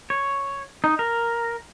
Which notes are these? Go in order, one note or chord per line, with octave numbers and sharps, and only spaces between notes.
C#5
D#4
A#4